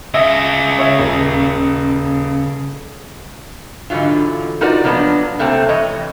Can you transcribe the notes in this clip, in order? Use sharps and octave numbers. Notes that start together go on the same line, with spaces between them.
C#3 D#5 E5
C#5 E5
D#1
G#2 D3 E3 F#3 F4
D#4 F4 F#4 A#4 B4 D5
F3 F#3 A#3 B3 D4 F#4
C3 A3 A#3 C4
F2 E3 C#5 D#5